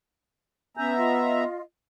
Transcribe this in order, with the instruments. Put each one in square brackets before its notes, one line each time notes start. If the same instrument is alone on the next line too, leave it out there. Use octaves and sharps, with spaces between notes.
[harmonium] B3 E5 A#5 [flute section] C#4 G#5 G6
[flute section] F4 D#5